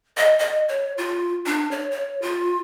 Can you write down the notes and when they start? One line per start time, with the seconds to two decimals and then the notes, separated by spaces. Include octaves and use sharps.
0.17 D#5
0.39 D#5
0.68 C#5
0.98 F4
1.46 D4
1.71 C#5
1.91 C#5
2.22 F4